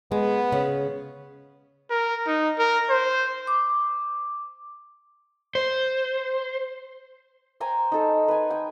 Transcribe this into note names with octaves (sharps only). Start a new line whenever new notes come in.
G#3 B3
C#3
A#4
D#4
A#4
C5
D6
C5
C5 G5 G#5 A#5
D#4 A4
B4 G#5
G5